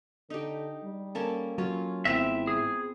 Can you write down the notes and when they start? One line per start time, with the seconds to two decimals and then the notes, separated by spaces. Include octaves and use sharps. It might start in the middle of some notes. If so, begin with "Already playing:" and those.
0.30 D3 D#4 G4
0.84 G3
1.15 A#3 C#4 A4
1.58 F#3 C#4 F4
2.05 G#1 B3 C4 E4 E5
2.47 G#4